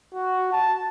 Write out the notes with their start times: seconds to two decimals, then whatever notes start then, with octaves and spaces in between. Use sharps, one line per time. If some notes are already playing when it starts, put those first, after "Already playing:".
0.14 F#4
0.52 A5